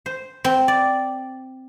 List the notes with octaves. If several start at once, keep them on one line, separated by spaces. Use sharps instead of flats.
C5
C4
D5